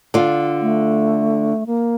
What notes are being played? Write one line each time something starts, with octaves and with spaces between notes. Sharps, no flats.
D3 F4
A3
A#3